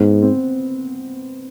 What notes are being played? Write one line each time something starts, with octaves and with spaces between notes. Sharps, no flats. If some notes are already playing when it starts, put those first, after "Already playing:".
Already playing: G#2 B3
C4